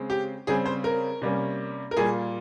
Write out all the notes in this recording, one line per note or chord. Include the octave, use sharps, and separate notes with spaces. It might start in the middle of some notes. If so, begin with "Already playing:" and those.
Already playing: C#3 G#3 C4
G4
C#3 G3 C4 G#4
C5
A#4
C3 G3 A#3 C#4
A#4
A#2 G3 A#3 G#4